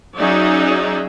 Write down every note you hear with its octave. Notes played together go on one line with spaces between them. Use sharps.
F#3 C#4 D#4 G#4 D5 E5